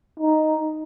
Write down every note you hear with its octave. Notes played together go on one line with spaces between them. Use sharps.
D#4